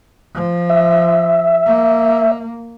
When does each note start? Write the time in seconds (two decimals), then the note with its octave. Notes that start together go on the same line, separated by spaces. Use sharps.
0.34 F3
0.70 E5
1.66 A#3